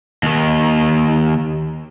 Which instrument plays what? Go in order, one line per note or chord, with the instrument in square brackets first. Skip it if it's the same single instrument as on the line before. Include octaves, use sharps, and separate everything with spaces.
[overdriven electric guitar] D#2 D#3